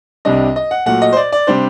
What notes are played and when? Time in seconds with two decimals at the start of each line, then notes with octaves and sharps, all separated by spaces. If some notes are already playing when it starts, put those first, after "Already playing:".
0.25 C2 C3 G3 D4 D#5
0.56 D#5
0.71 F#5
0.86 A#2 F#3 A3 F#5
1.02 D#5
1.13 C5
1.17 D5
1.32 D5
1.47 C3 G3 D4 C5